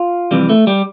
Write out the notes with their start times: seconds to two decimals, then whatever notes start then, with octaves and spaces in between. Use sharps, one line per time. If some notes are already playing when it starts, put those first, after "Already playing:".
Already playing: F4
0.31 F2 C3 E3 G3
0.49 A3
0.67 G3